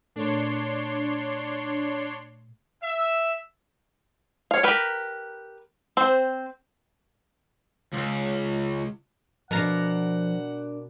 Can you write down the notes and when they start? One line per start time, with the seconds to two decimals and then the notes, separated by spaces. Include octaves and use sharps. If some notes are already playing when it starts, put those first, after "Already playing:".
0.16 A#2 A3 D4 A4 C#5 C6
2.83 E5
4.51 C#5 F5
4.63 G4 A#4 B4
5.97 C4 C5
7.93 C#2
9.51 B2 F3 D4 A#4 F5 F#5 A#5